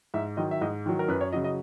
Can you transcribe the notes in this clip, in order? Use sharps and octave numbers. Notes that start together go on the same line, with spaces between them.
G#2 E5
D#3 F#3 D#5
E5
G#2 D#5
D#3 F#3
A#4
F#2 B4
C#5
C#3 F#3 D#5
D#5